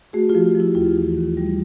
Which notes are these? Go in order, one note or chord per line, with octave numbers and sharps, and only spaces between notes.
A3 F#4 G#4
F4 G4
F3
F3
E4
D#2 F4
E3
D#2
G3